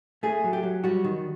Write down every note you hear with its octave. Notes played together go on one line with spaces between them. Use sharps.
A3 G#4
F#3
G4
F#3
G3 F#4
D#3